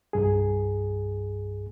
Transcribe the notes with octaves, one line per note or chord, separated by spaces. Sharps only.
C2 G2 G#4